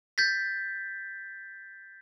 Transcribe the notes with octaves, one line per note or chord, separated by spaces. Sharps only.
G6 A6 B6